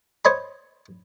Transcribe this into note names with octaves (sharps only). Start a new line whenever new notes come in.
C5 C#5 D#5 B5